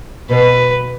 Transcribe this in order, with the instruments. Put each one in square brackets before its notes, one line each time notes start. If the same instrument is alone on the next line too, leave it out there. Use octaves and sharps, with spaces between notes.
[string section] B2 [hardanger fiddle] B4